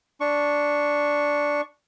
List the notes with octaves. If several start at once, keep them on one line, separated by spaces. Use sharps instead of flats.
D4 C#6